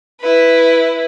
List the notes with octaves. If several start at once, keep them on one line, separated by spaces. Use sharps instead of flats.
E4 B4